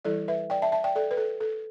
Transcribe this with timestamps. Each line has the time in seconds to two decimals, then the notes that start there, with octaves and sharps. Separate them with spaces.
0.05 E3 G3 E4 A4 D5
0.28 B4 E5
0.50 D5 G5
0.62 E5 A5
0.72 E5 A5
0.84 D5 G5
0.96 A4 D5
1.11 B4
1.17 A4
1.40 A4